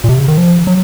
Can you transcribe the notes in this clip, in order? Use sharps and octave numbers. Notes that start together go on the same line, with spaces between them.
A#2
C3
C#3
D#3
F3
F#3